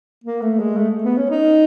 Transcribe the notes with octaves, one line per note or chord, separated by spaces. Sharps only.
A#3
A3
G#3
A3
B3
C#4
D#4